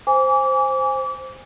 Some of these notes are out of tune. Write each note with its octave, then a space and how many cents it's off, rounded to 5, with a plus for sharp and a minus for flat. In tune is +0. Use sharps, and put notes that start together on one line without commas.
C5 +0 G#5 -15 D6 -35